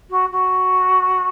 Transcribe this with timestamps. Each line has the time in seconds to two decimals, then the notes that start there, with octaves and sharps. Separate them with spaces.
0.10 F#4
0.31 F#4